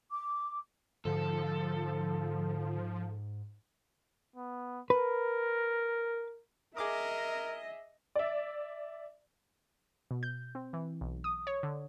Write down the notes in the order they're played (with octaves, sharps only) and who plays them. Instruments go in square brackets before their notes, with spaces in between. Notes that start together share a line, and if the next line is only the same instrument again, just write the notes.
[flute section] D6
[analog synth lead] G#2 [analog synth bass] D3 [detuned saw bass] F3 [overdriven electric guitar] A4
[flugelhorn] B3
[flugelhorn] A#4 [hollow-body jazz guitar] B4
[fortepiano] G#4 D6 D#6 [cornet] A#4 [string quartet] D#5 [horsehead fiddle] E5
[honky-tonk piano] D5 E5
[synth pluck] B2
G6
C4
E3
B1
D#6
C#5
D3